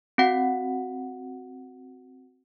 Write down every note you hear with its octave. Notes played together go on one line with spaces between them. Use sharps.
C4 F#4 F#5